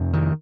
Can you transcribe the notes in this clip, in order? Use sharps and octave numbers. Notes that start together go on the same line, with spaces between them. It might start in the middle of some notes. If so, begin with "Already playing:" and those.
Already playing: F2 C3
D#3